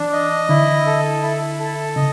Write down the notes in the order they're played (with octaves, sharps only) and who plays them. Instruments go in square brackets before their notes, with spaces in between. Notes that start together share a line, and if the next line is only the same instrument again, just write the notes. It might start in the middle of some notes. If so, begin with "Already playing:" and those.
Already playing: [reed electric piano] E3 [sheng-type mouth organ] D4
[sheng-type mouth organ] D#5
[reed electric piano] D3 [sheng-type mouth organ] E4
[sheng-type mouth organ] A4
E4
A4
[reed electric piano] C#3 [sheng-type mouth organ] D#5